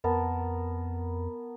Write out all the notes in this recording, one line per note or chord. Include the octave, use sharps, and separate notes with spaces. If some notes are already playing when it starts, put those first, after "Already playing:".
F2 B3 A#4 A5